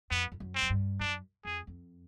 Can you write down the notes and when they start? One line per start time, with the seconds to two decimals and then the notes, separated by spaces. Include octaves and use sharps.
0.11 F2 B3
0.32 F2
0.40 F#2
0.55 C4
0.62 F#2
0.70 G2
1.00 F#2 D4
1.45 F2 G#4
1.67 F2